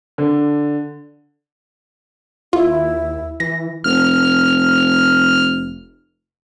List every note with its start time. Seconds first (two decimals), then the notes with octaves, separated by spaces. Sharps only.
0.18 D3
2.53 D#2 E4 F4
3.40 E3 A#6
3.84 F1 F6